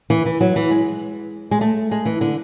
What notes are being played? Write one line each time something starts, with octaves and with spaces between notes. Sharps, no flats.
E3
E3
F#3
E3
G#3
G#3
A3
G#3
E3
D3